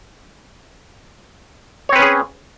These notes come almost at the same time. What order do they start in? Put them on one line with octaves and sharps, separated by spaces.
C#5 C4 B4 C#4 G#4